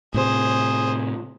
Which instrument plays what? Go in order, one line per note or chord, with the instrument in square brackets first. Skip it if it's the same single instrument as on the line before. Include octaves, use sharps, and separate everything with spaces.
[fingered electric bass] A2 C3 [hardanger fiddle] G#4 C5